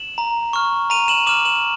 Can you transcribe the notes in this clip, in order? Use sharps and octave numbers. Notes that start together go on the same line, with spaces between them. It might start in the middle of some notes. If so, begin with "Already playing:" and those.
Already playing: E7 F#7
A#5
C#6 F6
A#5 D#7 F7
E7 F#7
D6 F6 E7 F#7
E7 F#7